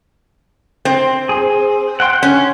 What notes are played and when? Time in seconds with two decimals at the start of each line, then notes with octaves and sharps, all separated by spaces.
0.85 C4
1.29 G#4
2.00 F#5 G5 C6
2.23 C#4